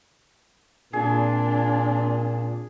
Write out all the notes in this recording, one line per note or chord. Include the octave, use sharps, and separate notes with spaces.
A#2 C4 D4 G#4